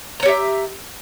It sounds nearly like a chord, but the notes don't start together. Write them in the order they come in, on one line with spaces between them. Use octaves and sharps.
A#5 C#5 G4 E5